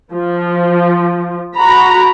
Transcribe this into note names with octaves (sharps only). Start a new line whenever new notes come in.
F3
F#4 A#5 B5